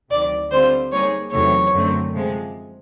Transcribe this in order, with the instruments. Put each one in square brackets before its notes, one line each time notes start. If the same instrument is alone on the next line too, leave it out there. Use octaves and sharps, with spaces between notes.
[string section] D2 C3 D#3 F#3 [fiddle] D5
[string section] D3 G3 C4 F4 [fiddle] C5
[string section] G3 A#3 D#4 G#4 [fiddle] C#5
[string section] E2 C3 D#3 F#3 A3 [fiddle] C#5
[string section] F#2 D3 F#3 A3 C4
C3 F3 G#3